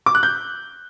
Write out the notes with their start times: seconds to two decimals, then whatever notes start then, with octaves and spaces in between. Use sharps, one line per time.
0.06 D6
0.15 F#6
0.23 G6